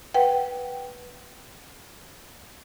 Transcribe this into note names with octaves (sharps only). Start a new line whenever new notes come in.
B4 F#5 G5